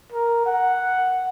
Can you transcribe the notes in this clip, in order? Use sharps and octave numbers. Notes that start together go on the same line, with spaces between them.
A#4
F#5